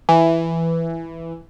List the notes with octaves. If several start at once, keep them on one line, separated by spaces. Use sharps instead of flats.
E3